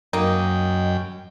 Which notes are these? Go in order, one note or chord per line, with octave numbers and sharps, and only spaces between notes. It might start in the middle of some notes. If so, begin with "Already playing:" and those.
F#2 A#3 D#4 G5